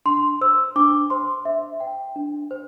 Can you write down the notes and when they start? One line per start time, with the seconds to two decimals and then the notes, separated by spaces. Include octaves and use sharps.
0.06 D4 C6
0.41 C5 E6
0.76 D4 D6
1.10 C5 C6
1.45 D4 E5
1.80 C5 G5
2.16 D4
2.51 C5